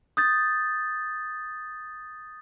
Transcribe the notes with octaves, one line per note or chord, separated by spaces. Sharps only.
D#6 G6 A6